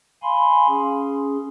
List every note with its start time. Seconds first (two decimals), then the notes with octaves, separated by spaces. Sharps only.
0.23 F5 G#5 B5 C6
0.68 C#4 G#4